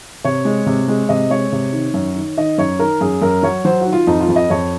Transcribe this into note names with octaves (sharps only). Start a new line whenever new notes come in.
C3 C#5
G#3
C3
G#3
C3 D#5
G#3 C#5
C3
D#3
F#2
D#3
D#3 D#5
F#2 C#5
D#3 A#4
F#2 G#4
F#2 A#4
F#3 C#5
F#3 C5
F#4
D#3
F4
F2 D#4
F4
F2
D#5
F2 C#5